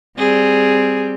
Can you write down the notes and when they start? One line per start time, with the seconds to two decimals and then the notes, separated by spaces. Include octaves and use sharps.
0.18 G3 C4 G#4